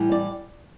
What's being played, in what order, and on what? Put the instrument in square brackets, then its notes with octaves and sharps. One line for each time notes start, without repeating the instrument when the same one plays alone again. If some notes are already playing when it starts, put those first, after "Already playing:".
Already playing: [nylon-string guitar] A2 E3 G3
D5